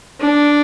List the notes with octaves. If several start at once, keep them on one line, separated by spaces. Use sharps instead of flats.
D4